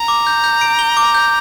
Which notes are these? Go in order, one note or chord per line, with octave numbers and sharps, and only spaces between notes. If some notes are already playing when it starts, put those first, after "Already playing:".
Already playing: A#5
D6
G6
G6
D7
G7
D6
G6